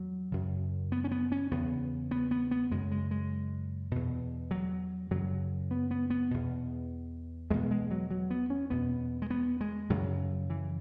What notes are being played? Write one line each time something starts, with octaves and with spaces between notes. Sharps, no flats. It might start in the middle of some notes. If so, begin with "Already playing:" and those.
Already playing: E2 F#3
F#2 C#3
B3
C#4
B3
C#4
E2 C#3 B3
B3
B3
B3
F#2 C#3 G#3
G#3
G#3
E2 B2
F#3
F#2 C#3 F#3
B3
B3
B3
E2 B2
E2 B2 G#3
G#3
F#3
F#3
B3
C#4
E2 B2 B3
G#3
B3
G#3
F#2 C#3 F#3
E3